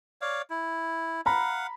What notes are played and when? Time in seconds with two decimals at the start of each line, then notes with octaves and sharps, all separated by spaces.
0.22 C#5 D5 F5
0.50 E4
1.26 F5 F#5 A#5 B5